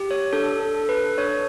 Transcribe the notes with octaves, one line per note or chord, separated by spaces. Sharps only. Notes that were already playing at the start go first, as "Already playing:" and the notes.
Already playing: G4
C#5
D4 A4
A4
A4
B4
D4 C#5